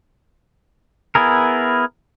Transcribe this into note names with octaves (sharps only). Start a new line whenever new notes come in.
B3 E4 G#4 A#4